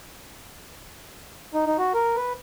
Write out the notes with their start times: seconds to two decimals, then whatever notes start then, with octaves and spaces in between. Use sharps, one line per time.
1.54 D#4
1.66 D#4
1.78 F#4
1.94 A#4
2.16 B4